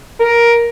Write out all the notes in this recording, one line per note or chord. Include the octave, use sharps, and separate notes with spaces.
A#4